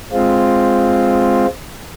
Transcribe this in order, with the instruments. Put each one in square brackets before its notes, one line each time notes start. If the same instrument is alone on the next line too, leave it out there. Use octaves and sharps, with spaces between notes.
[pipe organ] G#3 C4 F4